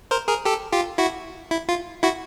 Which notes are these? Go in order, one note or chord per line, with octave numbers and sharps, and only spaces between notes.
A#4 C5
G#4 A#4
G4 A4
F4 G4
E4 F#4
E4
F4
E4 F#4